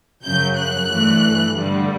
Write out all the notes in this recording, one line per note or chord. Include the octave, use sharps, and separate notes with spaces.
F#2 C#3 F#3 G6
F#6
G2 E3 A3
G2 D3 G3